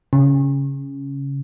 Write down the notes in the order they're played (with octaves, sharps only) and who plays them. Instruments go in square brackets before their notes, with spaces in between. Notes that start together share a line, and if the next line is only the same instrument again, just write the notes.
[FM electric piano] C#3